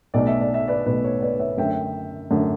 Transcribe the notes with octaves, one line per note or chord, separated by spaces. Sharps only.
B1 B2 A3 D5
E5
D5
E5
B4 D5
B1 B2 A3 B4
C#5
B4 D5
C#5 E5
F#2 D3 A3 E5 G5
F#2 D3 A3